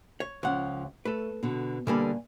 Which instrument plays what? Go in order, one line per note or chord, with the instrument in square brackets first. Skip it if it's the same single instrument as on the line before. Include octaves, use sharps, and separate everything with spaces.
[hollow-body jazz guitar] C#5
[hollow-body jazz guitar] C#2 F#5 [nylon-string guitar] F3 C#4
[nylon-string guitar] A3 [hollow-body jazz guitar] A4 B4
[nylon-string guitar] B2 D3
[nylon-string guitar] G2 A#3 G#5 [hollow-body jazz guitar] B2 D3 G3